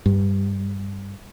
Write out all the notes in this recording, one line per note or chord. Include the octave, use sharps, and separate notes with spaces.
G2